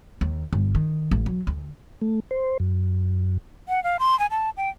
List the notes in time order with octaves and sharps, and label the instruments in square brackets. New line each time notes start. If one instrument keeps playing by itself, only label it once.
[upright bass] D#2
G1
D#3
A1
F#3
D2
[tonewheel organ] A3
C5
F#2
[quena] F#5
F5
C6
G#5
A5
G5